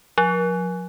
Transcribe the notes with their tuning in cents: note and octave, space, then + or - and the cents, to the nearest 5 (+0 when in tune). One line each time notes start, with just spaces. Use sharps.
F3 +45